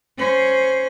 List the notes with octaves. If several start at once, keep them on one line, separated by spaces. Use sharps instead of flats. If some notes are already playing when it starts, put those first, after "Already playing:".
C#4 C5